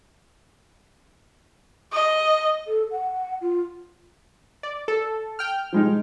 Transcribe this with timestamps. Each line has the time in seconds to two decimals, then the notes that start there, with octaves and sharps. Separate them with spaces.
1.93 D#5
2.67 A4
2.91 F#5
3.41 F4
4.63 D5
4.88 A4
5.39 G5 F6
5.73 F3 G#3 D#4